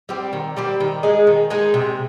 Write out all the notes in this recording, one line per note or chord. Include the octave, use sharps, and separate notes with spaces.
G3 C4 G4
D#3
G3 C4 G4
D#3
G#3 D#4 G#4
D#3
G#3 D#4 G#4
C3